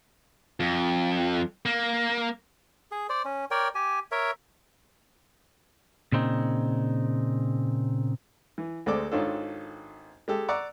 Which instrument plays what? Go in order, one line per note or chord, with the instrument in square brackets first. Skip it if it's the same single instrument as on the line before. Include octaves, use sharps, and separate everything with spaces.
[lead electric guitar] F2
A#3
[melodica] G#4
C5 D5
C#4
A#4 C#5 D5 G5
G4 G#5
A#4 C#5 E5
[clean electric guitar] A#2 C#3 C4 D#4
[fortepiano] E3
D2 G#3 C4 A4 D5 D6
G#1 D#3 C#4 D4 F4 A4
G#3 G4 A4
D5 F#5 A#5 C#6 D6 E6